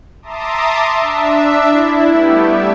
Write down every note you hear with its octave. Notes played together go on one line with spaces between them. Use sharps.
E5 A5 A#5 C6 D6 D#6
D4 E5
E4
G3 A3 B3 G4
D5 E5